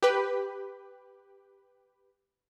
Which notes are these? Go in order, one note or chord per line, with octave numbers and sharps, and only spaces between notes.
G4 B4